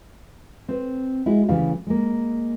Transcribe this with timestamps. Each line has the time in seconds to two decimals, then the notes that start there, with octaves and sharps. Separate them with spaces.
0.68 C4 B4
1.26 G#3 E4 F#4 G#4
1.49 D2 C#3 E3 G3 G4 F5
1.87 G#3 A#3